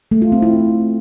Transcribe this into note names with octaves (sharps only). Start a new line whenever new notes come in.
A3
F4
C4
E4